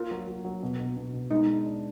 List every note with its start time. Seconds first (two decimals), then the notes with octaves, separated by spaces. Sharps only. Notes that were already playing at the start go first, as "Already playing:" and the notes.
Already playing: A#3 F4
0.11 F#3
0.28 F#3
0.45 F#3
0.63 B2
0.80 B2
0.97 B2
1.13 B2
1.31 G#3 D#4
1.48 D4
1.66 D4